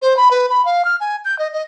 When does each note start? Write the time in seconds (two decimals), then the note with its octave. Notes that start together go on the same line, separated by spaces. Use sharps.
0.02 C5
0.17 B5
0.31 B4
0.50 B5
0.65 F5
0.85 F6
1.00 G#5
1.25 G6
1.39 D#5
1.53 D#5